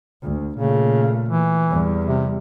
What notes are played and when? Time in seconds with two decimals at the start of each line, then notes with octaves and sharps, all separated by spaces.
0.22 D2
0.57 A#2 C#3 A3
1.29 E3
1.69 E2 G3
2.05 C3